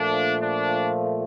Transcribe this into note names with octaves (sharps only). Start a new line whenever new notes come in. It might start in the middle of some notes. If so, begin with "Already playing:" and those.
Already playing: A#2 F3 A3 D4
D4